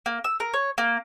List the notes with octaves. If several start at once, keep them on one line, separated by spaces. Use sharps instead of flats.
A#3
E6
A#4
C#5
A#3